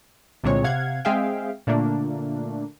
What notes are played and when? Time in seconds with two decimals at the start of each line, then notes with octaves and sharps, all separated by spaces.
0.44 C2 A#2 D3 G#3 C4 C#5
0.64 C3 F5 F#5 G#6
1.05 G#3 C4 G#4 E5 F5 G5
1.67 A#2 D3 A3 A#3 D4